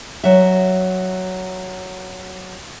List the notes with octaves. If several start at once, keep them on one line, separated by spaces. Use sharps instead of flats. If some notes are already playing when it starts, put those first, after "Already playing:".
F#3 E5